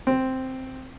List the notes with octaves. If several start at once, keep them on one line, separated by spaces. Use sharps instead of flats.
C4